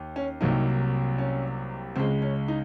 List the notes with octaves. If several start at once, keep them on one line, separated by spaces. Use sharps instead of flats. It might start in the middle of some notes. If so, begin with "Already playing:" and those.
Already playing: D#2
C#4
C2 C3 F#3 A#3 D#4
C#4
C#2 C#3 G#3 C4
C#4
D#4